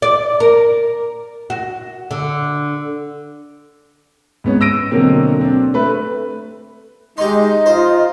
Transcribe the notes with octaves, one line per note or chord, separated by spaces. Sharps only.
D5
A#4
F#4
D3
G#2 B3 C#4
E6 A#6 D7 D#7
B2 D3 F#3 A#3 C4
C4 D4
A3 B4
G#3 D#4 G4 D#5 C6
F4 C5